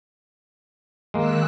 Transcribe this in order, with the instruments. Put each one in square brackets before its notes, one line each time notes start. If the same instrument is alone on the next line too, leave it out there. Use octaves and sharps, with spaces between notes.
[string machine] D#3 E6 F#6 [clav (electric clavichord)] G#3 A#3